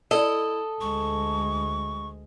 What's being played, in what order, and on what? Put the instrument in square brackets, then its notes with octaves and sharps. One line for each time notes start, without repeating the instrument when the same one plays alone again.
[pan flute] E4 [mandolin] A4 [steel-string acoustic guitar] D#5
[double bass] D2 G#3 [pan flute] C#6